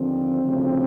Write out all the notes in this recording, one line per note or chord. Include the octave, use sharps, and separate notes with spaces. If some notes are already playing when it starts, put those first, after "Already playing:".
Already playing: D#2 D3 F3 C4
D2 C#3 F3